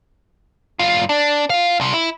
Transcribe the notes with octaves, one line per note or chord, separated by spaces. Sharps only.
G2 F4
D4
F4 F5
C2 C3
E4